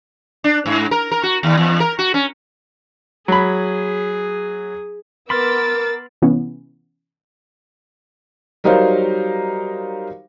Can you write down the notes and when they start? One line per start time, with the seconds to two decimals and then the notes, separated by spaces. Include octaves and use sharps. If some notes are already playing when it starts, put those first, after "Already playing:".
0.44 D4
0.66 G#2
0.91 A#4
1.11 A#4
1.23 F#4
1.43 D#2
1.58 E2
1.80 A#4
1.99 F#4
2.14 C#4
3.28 F#3 G#4 B5
5.30 B3 A#4 B5 C6 D6 E6 F6 A6
6.22 C3 E3 B3 C#4 E4
8.64 F#3 G3 D#4 A#4 C5 F5